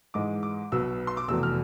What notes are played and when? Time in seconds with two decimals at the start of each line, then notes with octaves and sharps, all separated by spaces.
0.14 G#2 E3 G#3 D6
0.43 D6
0.72 B1 B2 B3 E6
1.07 C6
1.17 D6
1.28 F1 E2 B2 E6
1.43 F6